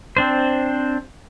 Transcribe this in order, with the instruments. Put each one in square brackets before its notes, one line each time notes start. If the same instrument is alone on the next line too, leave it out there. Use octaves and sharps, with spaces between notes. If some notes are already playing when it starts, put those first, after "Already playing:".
[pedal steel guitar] C4 D4 C5